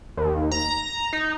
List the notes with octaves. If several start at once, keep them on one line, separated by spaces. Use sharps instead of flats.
D#2
A#5
D#4